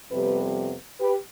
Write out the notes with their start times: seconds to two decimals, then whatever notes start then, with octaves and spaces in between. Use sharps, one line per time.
0.11 F2 C3 G3 B3 G4 B4
1.00 G4 B4